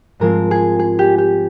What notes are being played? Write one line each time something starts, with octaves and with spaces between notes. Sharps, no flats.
G#2 F3 G#3 C4 A#4
G#4
G#4
G4
G4